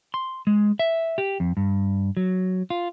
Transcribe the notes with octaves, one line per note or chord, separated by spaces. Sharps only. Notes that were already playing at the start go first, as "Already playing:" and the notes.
C6
G#3
E5
G4
F2
G2
F#3
F4